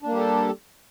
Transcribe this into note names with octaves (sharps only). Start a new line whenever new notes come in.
G3 A#3 D4 G4 A4